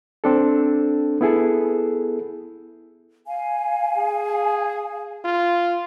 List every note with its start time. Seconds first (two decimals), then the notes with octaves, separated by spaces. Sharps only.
0.24 C4 D4 A4
1.21 B3 E4 G#4 A4
3.27 F5 G#5
3.97 G#4
5.25 F4